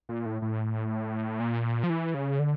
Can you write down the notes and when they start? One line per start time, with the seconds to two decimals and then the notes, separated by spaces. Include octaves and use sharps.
0.09 A#2
0.26 A2
0.42 A2
1.40 A#2
1.84 F3
1.90 E3
2.14 C#3
2.39 D3